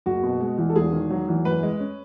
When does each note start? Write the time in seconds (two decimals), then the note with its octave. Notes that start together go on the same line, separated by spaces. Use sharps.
0.06 F#1 F#4
0.23 B2
0.41 G#3
0.58 E2
0.70 A4
0.76 E1 G#4
0.93 D#3
1.10 F#3
1.28 E2
1.45 F#2 B4
1.63 G#3
1.80 C#4